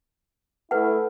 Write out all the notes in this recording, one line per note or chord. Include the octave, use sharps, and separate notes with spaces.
A3 E4 B4 F#5